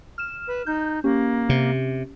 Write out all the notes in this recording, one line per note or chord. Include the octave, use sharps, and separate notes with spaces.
F6 E7
B4
D#4 G6
A#3 C#4 G4
C3